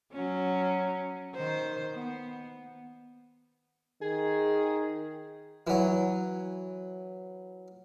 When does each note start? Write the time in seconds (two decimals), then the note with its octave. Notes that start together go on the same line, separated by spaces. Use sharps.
0.12 F#3 C#4
1.35 D#3 C5
1.95 B3
4.02 D#3 G#4
5.67 E3 F#3